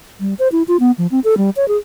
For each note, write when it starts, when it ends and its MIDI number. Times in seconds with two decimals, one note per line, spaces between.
0.20 0.34 55
0.39 0.48 72
0.52 0.63 64
0.68 0.77 65
0.80 0.91 59
0.98 1.07 53
1.11 1.20 60
1.24 1.37 69
1.37 1.50 55
1.56 1.68 73
1.68 1.77 68